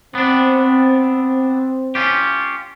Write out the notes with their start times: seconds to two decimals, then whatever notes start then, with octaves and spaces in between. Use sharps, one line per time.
0.15 B3 C4 D4
1.95 C#4 F4 G4